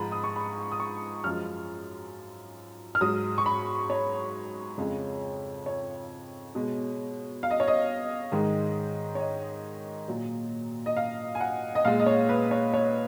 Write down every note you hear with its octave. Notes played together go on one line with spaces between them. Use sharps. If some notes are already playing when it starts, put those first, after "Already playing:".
Already playing: G#2 F3 G#3 A#5 B5
D#6
C#6
B5
D#6
C#6
F#2 F3 G#3 F6
F6
G#2 F#3 D#6
C#6
B5
C#5
F2 C#3 G#3
C#5
B2 G#3
F5
D#5
C#5
D#5
G#2 D#3 G#3
C#5
D#5
A#2 F#3
D#5
F5
G#5
F#5
D#5
A#2 G#3 F5
D#5
C#5
B4
C#5
C#5